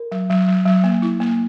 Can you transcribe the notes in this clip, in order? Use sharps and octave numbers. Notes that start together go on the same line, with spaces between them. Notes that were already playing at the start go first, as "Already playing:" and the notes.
Already playing: A#4
F#3
F#3
F#3
F#3
A#3
E4
A#3